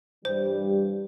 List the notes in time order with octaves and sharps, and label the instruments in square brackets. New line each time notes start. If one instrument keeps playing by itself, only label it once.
[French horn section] G2 E3 G3 [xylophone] C5